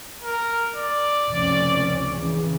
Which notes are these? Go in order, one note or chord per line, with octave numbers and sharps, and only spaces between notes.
A#4
D5
F1 C#2 C#4
C#3 E3